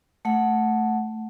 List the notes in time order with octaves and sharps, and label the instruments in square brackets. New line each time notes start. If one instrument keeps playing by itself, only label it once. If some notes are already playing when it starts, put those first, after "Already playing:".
[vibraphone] A3 F#5